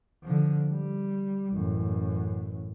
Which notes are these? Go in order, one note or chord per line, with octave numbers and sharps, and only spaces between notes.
D3 F3
G3
A1 F#2